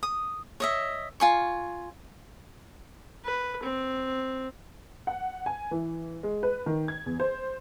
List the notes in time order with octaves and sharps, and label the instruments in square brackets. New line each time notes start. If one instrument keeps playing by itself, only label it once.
[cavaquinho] D#6
C#5 D#5 E5
F4 G#5 C#6
[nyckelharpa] B4
C4
[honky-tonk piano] F#5
G#5
E3
G#3
B4
D#3
G#6
E2
C5